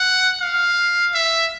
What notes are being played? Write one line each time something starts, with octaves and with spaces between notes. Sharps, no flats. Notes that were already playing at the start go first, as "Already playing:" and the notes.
Already playing: F#5
F5
E5